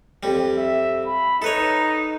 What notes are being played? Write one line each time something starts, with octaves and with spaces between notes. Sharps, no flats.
F2 G3
E5
B5
D#4 A4 B4 C#5